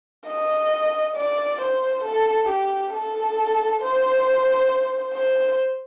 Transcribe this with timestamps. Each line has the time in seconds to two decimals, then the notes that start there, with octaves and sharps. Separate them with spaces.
0.27 D#5
1.16 D5
1.61 C5
2.04 A4
2.49 G4
2.93 A4
3.82 C5
5.13 C5